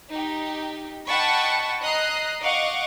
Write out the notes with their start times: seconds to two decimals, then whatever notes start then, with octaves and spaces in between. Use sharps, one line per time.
0.11 D#4 G4
1.06 D#5 F#5 G5 A5 B5 C#6
1.81 D#5 A#5 D#6 F#6 C7
2.42 D#5 F5 F#5 C#6 D6